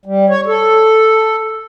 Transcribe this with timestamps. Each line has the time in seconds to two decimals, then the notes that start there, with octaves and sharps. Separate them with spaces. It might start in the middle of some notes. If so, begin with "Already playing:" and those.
0.06 G3
0.29 C#5
0.47 A4